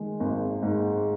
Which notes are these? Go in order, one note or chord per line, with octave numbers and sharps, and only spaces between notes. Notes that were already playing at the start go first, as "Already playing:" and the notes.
Already playing: D#3 G#3
G#1
G#2